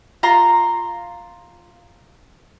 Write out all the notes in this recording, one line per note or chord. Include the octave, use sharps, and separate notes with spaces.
F4 A#5 C6